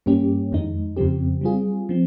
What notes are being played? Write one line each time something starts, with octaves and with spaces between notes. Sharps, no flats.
G2 G3 A#3 C#4 G4
F2 D#3 G#3 D#4
F2 C#3 F3 C4 G4
G3 C4 F4 G#4
F3 C4